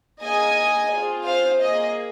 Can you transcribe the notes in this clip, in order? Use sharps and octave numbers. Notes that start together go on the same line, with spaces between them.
A#3 G#4 D#5 G#5
C4 F4 G#4
C5 F5
A#3 G#4 D#5